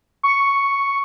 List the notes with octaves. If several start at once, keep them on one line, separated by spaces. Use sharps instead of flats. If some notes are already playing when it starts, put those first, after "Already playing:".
C#6